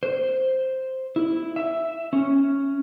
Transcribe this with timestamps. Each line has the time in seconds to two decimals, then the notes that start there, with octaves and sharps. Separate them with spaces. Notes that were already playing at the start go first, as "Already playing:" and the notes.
0.03 C5
1.16 E4
1.56 E5
2.13 C#4